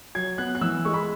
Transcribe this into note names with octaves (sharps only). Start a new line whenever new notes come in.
F#3 G#6
B3 F#6
F#6
E3 E6
G#3 C#6
B5